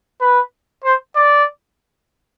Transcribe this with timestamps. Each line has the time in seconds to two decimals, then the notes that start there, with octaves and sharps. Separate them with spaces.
0.21 B4
0.84 C5
1.16 D5